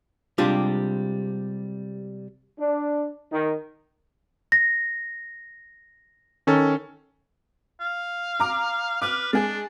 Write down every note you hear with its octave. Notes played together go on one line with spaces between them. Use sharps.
C3 G3 G#3 D4 F4 G4
D4
D#3
A#6
D#3 C#4 A4
F5
A#5 D6
B4 D6 F6
G#3 D4 G#4